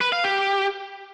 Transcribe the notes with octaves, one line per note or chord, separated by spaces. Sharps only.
B4
F5
G4